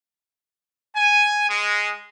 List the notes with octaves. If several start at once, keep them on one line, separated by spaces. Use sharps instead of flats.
G#5
G#3